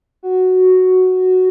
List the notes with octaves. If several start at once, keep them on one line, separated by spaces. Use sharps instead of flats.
F#4